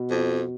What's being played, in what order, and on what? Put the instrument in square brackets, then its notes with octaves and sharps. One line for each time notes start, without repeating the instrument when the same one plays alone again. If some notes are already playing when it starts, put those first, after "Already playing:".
Already playing: [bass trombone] B2
[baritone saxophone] F2